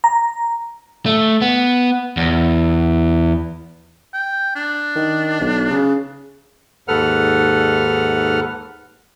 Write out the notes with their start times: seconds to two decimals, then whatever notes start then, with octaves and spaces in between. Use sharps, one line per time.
0.04 A#5
1.06 A3
1.42 B3
2.17 E2
4.14 G5
4.56 D4
4.96 D#3
5.41 B1
5.70 C#3
6.88 D#2 G#2 A4 B4 F#5 F6